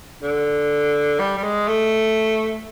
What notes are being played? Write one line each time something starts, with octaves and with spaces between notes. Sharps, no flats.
D3
G3
G3
G#3
A3